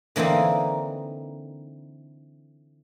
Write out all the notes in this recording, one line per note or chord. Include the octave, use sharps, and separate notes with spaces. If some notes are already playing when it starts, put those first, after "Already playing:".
D3 E3 A#3 C4 D#4